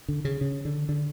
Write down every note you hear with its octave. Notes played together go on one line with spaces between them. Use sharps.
D3
C#3
C#3
D3
D3